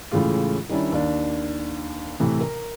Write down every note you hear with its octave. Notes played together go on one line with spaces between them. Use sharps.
A2 C#3 E3 G#3 F4
D#3 G3 C#4 D4 E4
D#2 D4
A2 C3 E3
A#4